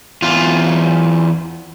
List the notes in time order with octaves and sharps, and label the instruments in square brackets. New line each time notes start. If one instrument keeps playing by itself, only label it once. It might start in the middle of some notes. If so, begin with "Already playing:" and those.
[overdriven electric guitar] E2 F4